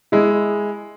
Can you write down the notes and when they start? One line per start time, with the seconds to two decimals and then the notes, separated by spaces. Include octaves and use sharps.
0.12 G#3 E4